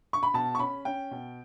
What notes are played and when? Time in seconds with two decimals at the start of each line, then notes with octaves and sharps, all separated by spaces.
0.13 C#6
0.23 B5
0.34 B2 A5
0.55 C#6
0.59 C#4 B5
0.85 C#4 G5
1.11 B2